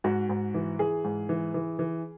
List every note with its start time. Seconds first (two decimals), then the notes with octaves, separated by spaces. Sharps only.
0.04 G#2 F#4
0.29 G#2
0.54 E3
0.79 E3 G#4
1.04 G#2
1.29 E3
1.54 E3
1.79 E3